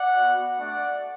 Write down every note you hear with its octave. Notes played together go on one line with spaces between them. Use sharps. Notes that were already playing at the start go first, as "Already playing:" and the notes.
Already playing: D5 F#5
B3 F#4
A3 D4 F#4 D5 F#5